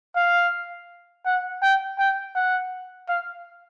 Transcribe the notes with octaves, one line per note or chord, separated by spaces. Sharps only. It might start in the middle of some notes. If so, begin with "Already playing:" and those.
F5
F#5
G5
G5
F#5
F5